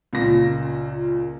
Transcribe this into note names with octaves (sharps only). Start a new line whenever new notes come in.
C#2 A#2 A#6